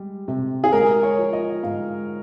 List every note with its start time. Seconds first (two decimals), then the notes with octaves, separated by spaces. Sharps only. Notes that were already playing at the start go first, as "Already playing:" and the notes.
Already playing: G3 G#3
0.28 C3
0.64 G#4
0.72 G#3 A#4
1.03 C#5
1.18 F3
1.33 D#5
1.63 G#2 F5